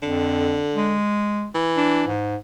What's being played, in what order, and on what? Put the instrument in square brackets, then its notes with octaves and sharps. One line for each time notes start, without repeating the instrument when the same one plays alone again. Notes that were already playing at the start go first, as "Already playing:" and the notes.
[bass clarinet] F2 [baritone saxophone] D3
[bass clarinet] G#3
[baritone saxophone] E3
[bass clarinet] D4
G#2